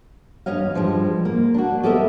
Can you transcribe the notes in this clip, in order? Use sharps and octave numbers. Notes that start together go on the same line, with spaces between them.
G2 C#4 C#5 D#5 F5
E2
G2 F3 G3 G#3
A#3
D4 F#4
B3 G4 A4 A#4 D#5 E5